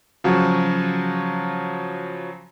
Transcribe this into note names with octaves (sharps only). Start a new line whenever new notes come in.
C#3 F3 F#3 F#4